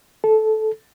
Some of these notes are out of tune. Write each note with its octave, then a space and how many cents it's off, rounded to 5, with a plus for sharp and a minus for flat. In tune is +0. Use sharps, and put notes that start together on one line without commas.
A4 -15